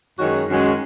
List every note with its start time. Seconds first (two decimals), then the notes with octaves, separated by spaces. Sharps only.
0.19 F#2 D#3 G#3 C#4 F#4
0.48 F#2 D#3 G#3 C#4 F#4